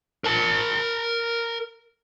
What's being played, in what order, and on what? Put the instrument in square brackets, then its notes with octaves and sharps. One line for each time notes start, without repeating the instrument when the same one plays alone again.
[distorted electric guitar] A#4 A5